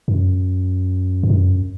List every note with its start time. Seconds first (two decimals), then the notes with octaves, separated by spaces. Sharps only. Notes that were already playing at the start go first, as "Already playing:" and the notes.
0.08 F#2
1.23 G2
1.30 F#2